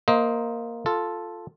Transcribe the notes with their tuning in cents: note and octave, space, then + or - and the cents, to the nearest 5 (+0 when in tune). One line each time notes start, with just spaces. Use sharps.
A#3 +0 C5 +0 D#5 +25
F4 +0 A4 +0